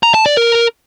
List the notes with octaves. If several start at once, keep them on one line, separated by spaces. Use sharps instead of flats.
A#5
A5
D5
A#4